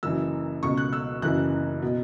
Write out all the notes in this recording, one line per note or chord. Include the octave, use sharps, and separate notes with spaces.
F#1 F#2 E3 E6
C#2 B2 C#6
F#6
E6
F#1 F#2 E3 F#6
B2